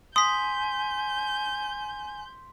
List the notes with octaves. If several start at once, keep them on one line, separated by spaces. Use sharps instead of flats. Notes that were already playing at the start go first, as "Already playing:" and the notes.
G#5 C6 D#6 G6 B6